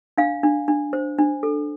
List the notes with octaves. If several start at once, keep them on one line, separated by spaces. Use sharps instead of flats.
D4 F5
D4
D4
C5
D4
A4